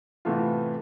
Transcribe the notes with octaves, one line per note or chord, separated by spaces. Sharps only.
A2 C3 E3 A3 B3 F4